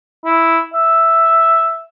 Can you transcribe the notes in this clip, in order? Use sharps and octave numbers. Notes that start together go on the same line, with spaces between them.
E4
E5